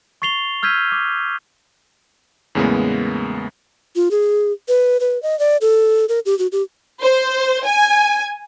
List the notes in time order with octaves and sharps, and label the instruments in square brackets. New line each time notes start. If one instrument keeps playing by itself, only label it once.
[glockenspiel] C#6 A6 C7 F7 G7
E6 F6 G6 G#6 B6 D#7
D6
[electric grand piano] E2 A2 C#3 G#3 A#3 B3
[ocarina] F4
G#4
B4
B4
D#5
D5
A4
A#4
G4
F#4
G4
[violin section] C5
G#5